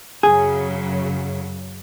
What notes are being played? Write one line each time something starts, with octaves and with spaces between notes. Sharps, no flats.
F#2 C#3 F#3 G#4